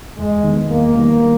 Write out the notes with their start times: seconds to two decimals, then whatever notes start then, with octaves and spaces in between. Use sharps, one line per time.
0.18 E2 G#3
0.44 D#3 G3 B3
0.69 E2 A#3
0.96 D#3 G3 B3